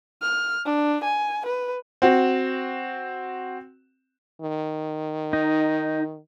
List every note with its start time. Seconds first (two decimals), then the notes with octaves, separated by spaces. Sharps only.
0.22 F6
0.65 D4
1.04 G#5
1.46 B4
2.02 C4 F#4
4.42 D#3
5.33 D#4